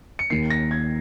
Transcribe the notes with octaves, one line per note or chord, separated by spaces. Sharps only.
C#7
D#2 D#3 A#3 C7
A#6
G#6